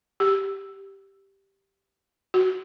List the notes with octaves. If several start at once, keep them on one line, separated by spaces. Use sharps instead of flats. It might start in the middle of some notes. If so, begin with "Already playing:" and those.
G4
F#4